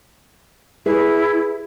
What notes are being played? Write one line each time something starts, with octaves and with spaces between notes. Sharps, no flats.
E4 G#4 B4 E5